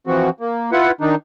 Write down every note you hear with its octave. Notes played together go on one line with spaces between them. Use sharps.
E3 F3 C4 F#4
A#3
E4 F4 B4 F#5
D#3 D4 D#4